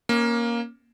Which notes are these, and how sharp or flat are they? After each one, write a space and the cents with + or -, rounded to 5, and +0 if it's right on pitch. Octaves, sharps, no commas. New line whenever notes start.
A#3 +10 C#4 -10